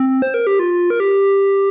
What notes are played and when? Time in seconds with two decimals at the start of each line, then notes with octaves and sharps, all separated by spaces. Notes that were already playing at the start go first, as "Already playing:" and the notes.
Already playing: C4
0.22 C5
0.34 A#4
0.47 G4
0.59 F4
0.90 A#4
1.00 G4